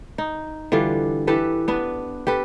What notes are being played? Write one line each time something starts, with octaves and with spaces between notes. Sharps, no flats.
D#4
D3 E3 G3 F4
E3 G4 A4 B4
B3 D4 B4
G4 A4 B4